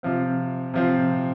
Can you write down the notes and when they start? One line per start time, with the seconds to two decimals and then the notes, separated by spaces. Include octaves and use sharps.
0.03 C3 F3 C4
0.74 C3 F3 C4